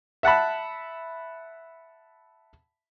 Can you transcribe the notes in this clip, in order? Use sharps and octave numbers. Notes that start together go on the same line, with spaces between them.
E5 F#5 A5 B5